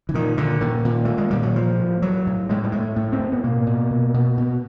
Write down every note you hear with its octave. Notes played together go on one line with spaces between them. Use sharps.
E3
A#2 D#3
A#2 D3
A#2 D#3
A#2
A#2 A3
G#3
A#2 G3
F#3
A2 F3
A2
A2 F#3
A2
A2 G#3
G3
A2 G#3
A3
A2
C4
A2
B3
B2 A#3
B2
B2
B2
B2